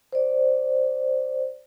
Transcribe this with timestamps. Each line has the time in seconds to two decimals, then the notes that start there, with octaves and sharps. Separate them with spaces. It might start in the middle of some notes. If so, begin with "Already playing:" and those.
0.12 C5 D5